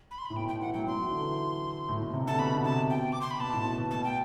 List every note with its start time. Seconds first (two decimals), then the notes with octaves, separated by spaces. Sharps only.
0.11 B5
0.18 C6
0.26 B5
0.30 A2
0.36 B2 G5
0.48 G5
0.61 E3 F#5
0.74 F#3 G5
0.87 F#3 C6
0.99 E3
1.11 D3
1.23 E3
1.89 A2
2.01 B2
2.13 C3
2.26 D3 A5
2.39 B2 B5
2.54 D3
2.64 C3 A5
2.90 G5
3.12 D6
3.21 C6
3.31 B5
3.40 B2 A5
3.53 A2
3.65 B2
3.78 B2
3.91 B2 A5
4.04 G5